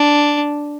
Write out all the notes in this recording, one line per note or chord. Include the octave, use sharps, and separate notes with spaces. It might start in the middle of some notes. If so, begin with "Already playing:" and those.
Already playing: D4